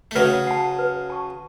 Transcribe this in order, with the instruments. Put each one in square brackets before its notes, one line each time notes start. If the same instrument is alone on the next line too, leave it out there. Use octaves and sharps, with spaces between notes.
[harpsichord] A3
[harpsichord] C#3 F#3 [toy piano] B4
[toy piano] F#5 A5
B4
A5 C#6